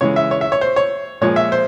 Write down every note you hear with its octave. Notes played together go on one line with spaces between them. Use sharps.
C#3 E3 G#3 C#5
E5
C#5
E5
C#5
C5
C#5
A#2 F3 G#3 C#5
E5
C5